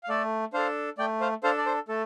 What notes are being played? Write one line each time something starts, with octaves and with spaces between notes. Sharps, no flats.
F5
A3 A4 D5
D4 A4 C5 F5
A3 D5 G5
C5 F5
D4 A4 C5 F5
D5
C5
A3 A4